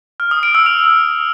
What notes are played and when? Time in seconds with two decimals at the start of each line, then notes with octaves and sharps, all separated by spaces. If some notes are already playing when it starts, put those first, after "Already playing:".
0.20 F6
0.31 D#6
0.43 D7
0.55 E6
0.66 F7